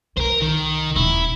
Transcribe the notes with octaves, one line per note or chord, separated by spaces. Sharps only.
C2 A#4 C5
D#3
D#1 E4